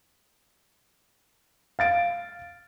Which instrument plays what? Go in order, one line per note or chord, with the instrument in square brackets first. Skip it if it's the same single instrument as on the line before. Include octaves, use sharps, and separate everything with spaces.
[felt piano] F5 A6 D7